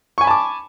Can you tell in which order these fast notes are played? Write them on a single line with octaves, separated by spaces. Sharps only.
C#6 G#5 B5 A5 D6